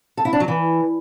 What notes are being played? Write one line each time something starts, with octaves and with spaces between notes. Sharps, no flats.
A4
E4
D4
F#3
E3